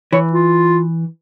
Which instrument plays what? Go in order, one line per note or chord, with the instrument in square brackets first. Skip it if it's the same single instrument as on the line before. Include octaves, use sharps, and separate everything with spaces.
[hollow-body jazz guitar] E3 [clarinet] C#5
[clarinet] F4